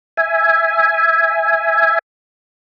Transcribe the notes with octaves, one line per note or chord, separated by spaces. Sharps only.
E5 G#5